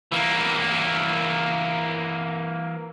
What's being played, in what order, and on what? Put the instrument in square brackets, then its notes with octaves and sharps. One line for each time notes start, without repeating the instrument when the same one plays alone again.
[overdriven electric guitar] E3 A#3